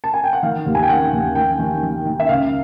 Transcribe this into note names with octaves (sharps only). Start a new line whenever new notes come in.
A5
G#5
G5
F#5
D#3 F5
D#2
G#5
G5
D#3 F#5
D#2
D#3 G5
D#3
D#3
D#3
E5
C#2 F5